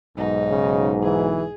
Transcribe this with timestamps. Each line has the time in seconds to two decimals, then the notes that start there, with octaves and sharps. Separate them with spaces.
0.18 B1 G#2 D#4
0.50 C#3
1.04 E3 G#4